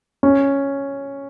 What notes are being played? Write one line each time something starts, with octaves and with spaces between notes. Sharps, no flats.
C#4